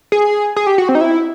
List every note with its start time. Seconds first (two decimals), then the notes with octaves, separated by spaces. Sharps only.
0.12 G#4
0.56 G#4
0.67 G4
0.78 F#4
0.89 C4
0.95 D#4
1.01 E4